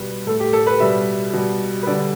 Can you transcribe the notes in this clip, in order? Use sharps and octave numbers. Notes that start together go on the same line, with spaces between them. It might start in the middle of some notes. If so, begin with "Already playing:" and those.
Already playing: B2 G3 B4
A2 A3 A4
G4
A4
B4
B2 G3 E5
B2 G3
B4
D3 G3 D5